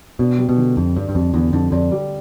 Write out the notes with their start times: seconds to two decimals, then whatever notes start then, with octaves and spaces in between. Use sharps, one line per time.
0.19 B2 D4
0.38 G3
0.49 B2
0.57 D3
0.76 F2 D3
0.96 G2 D4
1.09 G2
1.15 F2 G3
1.34 E2 D3
1.53 F2 D3
1.72 F2 D4
1.92 G3